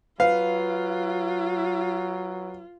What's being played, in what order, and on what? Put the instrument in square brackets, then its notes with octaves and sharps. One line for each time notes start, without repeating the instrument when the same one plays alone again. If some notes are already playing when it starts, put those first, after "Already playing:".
[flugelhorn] F#3 [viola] F4 [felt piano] B4 [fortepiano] F5